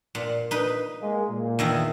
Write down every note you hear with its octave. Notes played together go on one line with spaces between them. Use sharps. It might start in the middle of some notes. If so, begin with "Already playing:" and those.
A#2
D#4 B4
G#3 A#3
A#2
E2 D#3 E4